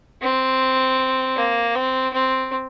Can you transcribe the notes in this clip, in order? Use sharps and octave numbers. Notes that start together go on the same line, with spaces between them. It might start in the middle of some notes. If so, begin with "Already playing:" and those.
C4
A#3
C4
C4